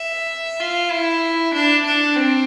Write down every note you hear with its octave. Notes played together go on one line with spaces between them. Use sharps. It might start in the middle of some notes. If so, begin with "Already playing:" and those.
Already playing: E5
F4
E4
D4
D4
C4